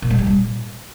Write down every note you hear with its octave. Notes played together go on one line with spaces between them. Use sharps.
A#2
G#3
G3
A#2